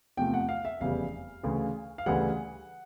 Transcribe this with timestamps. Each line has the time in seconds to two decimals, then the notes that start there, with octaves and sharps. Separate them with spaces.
0.17 E2 C3 F3 A3 G5
0.34 F#5
0.49 F5
0.65 E5
0.80 F1 E2 C#3 E3 G3 F5
1.43 D2 C#3 E3
1.98 F5
2.06 D2 C#3 E3 G3 F#5